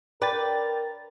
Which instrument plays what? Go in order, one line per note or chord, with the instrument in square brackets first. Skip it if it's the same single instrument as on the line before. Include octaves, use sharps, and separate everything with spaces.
[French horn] A#4 [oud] B4 [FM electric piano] D5 G5 A6